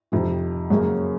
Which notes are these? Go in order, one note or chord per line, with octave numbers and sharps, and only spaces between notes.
F2 C3 D#3
F#2 C#3 F#3 A#3